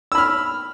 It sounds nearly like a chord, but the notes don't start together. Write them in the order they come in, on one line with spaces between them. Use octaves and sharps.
E6 B5 F6